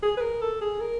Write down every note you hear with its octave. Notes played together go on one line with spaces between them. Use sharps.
G#4
B4
A#4
A4
G#4
A#4